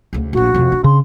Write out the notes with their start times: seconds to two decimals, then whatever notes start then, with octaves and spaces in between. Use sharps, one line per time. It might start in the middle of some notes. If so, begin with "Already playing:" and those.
0.13 D2 C#3
0.33 A#1 D4 F#4
0.54 F2 C3
0.72 D4
0.84 C#3 C6